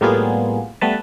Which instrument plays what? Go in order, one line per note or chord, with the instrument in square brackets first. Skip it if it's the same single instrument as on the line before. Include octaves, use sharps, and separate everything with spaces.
[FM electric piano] A2 G3 A#3 B3 F4 G#4
G3 A3 B3 B4 A5